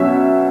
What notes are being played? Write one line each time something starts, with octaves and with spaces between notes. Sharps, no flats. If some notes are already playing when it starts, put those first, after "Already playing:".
Already playing: B2 F#3 C#4 E5